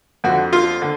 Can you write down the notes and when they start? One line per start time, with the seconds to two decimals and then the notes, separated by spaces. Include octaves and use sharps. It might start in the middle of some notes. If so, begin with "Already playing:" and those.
0.24 F2 F#4
0.29 D3
0.53 F4
0.82 D3